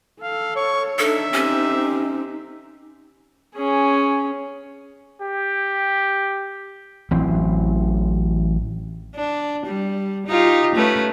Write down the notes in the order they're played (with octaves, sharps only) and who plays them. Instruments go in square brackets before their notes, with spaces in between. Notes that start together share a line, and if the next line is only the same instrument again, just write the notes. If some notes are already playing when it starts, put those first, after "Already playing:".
[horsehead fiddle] A4 [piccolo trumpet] F5
[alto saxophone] C#5 [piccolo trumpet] C#6
[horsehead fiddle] D4 D#4 [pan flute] A4 [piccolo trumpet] E5
[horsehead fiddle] C4 D#4 [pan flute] C#4 [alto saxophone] G4
[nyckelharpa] C#4 G#4
[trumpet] G4
[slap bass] A1 E3 F#3 C4
[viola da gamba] D4
G3
D#4 F4 G4
A3 C#4 B4